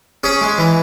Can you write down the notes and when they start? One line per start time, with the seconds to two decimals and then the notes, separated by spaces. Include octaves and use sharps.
0.24 C#4 G#4
0.41 G#3
0.58 E3